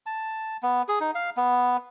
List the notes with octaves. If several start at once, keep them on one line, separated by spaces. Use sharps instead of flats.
A5
B3
G#4
D#4
F5
B3